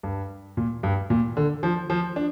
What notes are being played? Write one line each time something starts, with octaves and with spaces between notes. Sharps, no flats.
G2
A#2
G2
A#2
D3
F3
F3
D4